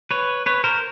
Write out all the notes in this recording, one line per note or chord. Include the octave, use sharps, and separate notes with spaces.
B4 C#5
B4 C#5
A#4 C5